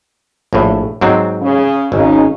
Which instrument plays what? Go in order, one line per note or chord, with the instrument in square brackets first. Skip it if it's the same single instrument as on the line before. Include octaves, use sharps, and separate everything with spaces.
[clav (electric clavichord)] A#1 A2
G#2 F#3 C4
[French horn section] C#3
[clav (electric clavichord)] G#1 [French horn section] C#3 C#4 D#4